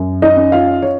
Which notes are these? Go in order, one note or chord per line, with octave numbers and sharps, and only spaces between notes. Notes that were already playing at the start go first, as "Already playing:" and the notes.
Already playing: F#2
D#4 D#5
C#4
F4 F5
C#5